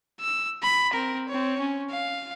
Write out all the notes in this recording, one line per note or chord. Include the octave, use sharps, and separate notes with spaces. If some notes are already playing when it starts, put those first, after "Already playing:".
E6
B5
C4 A#4
C4 C#5
C#4
F5